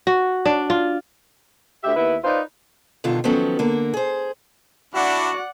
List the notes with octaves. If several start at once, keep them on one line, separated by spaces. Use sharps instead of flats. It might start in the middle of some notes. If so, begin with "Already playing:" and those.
F#4
D4
F4
D2 G4 E5
D#2 B3 E4 B4 E5
D#4 F4 B4 C5 D5
G2 B2 D3 D#3 F4
D#3 F3 F#3 B3 C#4 A4
D3 A#3 A#4
G#4 C5
D4 E4 F#4 D5 F#5